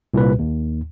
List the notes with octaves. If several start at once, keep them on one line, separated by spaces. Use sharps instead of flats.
C2 A#2 B4
D#2